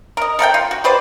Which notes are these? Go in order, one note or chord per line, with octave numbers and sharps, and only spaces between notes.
A#4 D#5
A4 A#4 F#5 G5
F4
F#4
G4 B4 C5 D5